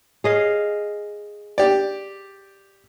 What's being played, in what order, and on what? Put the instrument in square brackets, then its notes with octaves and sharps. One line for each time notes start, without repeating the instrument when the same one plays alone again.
[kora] G#4 D#5 F5
[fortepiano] G4 D5